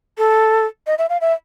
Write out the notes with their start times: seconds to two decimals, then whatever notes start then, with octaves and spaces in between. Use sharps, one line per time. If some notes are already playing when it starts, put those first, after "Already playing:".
0.18 A4
0.87 D#5
0.98 E5
1.09 F5
1.21 E5